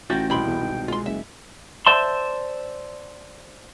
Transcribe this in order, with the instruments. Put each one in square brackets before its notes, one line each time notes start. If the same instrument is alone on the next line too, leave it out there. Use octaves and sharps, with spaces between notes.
[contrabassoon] A1 [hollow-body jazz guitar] F4 F#4 E5 [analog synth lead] G5 [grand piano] G6 A6 A#6
[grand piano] C2 B2 [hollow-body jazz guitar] E4 B5 C6 [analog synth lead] G5
[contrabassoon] E2
G#1
[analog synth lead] G#3 [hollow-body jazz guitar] F4 C6
[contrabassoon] F#1 [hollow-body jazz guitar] E5
[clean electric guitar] C5 D5 E5 A5 C6